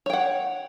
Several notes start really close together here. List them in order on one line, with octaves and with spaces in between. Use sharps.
C#5 G5 F#5